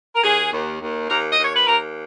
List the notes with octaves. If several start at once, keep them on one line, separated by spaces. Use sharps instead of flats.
A#4
D#2 G#4
D#2
D#2
D#2 A#4
D#5
D#2
C#5
B4
D#2 A#4